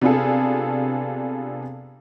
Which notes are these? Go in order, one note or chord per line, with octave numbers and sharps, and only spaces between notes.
C3 B3 D4 F4 G#4 A4